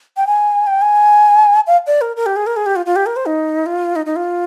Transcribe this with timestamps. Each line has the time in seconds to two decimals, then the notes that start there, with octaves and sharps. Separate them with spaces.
0.17 G5
0.27 G#5
0.67 G5
0.82 G#5
1.67 F5
1.87 D5
2.01 A#4
2.17 A#4
2.26 G4
2.36 G#4
2.47 A#4
2.56 G#4
2.66 G4
2.76 F4
2.86 F4
2.96 G4
3.06 A#4
3.16 C5
3.26 D#4
3.66 F4
3.96 D#4
4.06 D#4
4.16 F4